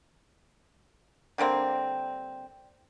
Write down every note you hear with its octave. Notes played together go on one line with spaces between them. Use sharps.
D3 G3 A#3 C4